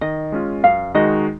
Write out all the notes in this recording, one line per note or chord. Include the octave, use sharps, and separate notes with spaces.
D#3 D#5
G#3 C#4 F4
F#2 F5
D#3 G#3 D#4 F#4 D#5